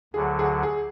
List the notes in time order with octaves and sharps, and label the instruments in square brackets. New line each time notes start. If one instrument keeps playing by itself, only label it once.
[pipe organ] D2 D3 F#3 [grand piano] G#4
[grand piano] G#4
G#4